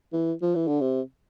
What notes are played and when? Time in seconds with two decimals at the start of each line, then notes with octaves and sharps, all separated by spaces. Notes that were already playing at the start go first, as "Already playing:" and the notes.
0.13 E3
0.42 F3
0.55 E3
0.67 D3
0.81 C3